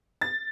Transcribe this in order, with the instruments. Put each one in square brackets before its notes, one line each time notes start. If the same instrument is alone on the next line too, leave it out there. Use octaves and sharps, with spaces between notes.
[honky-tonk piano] A6